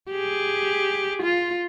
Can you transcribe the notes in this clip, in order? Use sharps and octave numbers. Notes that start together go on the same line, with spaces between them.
G4 G#4
F4